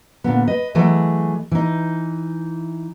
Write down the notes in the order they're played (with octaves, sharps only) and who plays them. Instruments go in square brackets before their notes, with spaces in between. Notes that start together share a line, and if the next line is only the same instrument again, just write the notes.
[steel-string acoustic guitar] A#2 D3 B3
B4 D#5
E3 F#3 A3 G#4 D#5
E3 D#4